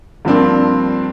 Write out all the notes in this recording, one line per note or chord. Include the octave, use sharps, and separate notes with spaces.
G2 F3 A#3 C4 D4